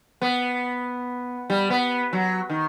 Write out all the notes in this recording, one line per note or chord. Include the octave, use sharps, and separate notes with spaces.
B3
G3
B3
F#3
D#3